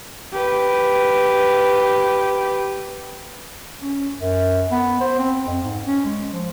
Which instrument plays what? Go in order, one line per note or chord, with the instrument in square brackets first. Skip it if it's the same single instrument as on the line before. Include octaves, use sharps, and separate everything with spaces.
[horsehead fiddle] G4 B4
[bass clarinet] C#4
F#2
B3
C5
C4
F2
G#2
C#4
G#3
F3